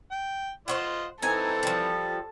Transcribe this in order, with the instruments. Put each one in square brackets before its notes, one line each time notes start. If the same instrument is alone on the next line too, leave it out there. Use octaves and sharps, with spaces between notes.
[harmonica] G5
[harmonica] F4 D#5 [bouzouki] C5 C#5 F#5
[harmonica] E3 C4 [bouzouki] D#4 G#5 [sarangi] A4
[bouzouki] F3 G3